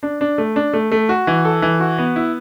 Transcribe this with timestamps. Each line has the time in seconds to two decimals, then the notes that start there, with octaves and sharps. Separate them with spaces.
0.03 D4
0.21 D4
0.38 A3
0.56 D4
0.73 A3
0.92 A3
1.09 F#4
1.27 E3
1.45 A4
1.62 E3
1.80 F#4
1.98 B3
2.16 E4